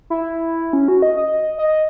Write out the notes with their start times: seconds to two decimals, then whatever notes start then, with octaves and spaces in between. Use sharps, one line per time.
0.10 E4
0.73 C#4
0.88 F#4
1.02 D#5
1.17 D#5
1.58 D#5